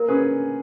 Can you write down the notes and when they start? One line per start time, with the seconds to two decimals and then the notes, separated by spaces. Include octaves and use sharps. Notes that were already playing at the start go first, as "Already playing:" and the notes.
Already playing: A#3 A#4
0.08 C#4 G#4 B4